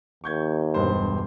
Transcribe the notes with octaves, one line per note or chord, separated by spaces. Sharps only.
D#2 C#6 G6 G#6
E1 G2 C5